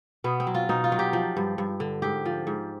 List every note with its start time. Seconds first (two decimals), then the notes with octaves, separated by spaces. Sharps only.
0.24 B2 B3
0.40 C4
0.47 F#3
0.54 F4
0.69 B2 D#4
0.84 F4
0.92 F#3
0.99 G4
1.13 F3
1.37 G2
1.58 G2
1.80 D3
2.02 G#2 G4
2.25 F3
2.47 G#2